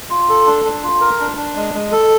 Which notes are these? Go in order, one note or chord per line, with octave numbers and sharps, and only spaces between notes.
F4
A4
D4
D4
F4
A#4
D4
D4
G#3
G#3
A4